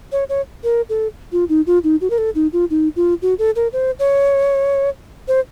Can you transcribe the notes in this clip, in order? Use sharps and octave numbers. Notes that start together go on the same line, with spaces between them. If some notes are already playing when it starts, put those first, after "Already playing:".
C#5
C#5
A#4
A4
F4
D#4
F4
D#4
F#4
A#4
A4
D#4
F4
D#4
F4
F#4
A4
A#4
C5
C#5
C5